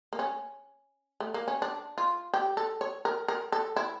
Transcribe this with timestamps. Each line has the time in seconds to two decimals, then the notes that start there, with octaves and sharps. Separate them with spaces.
0.13 A#3
0.19 C#4
1.20 A3
1.34 A#3
1.48 C#4
1.62 D4
1.98 F4
2.34 G4
2.57 A4
2.81 C#5
3.05 A#4
3.28 A#4
3.52 A4
3.76 E4